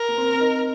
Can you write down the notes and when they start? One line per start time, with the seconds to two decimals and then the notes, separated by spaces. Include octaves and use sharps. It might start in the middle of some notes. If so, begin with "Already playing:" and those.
Already playing: A#4
0.09 A#3
0.17 C4
0.32 C4
0.40 D#4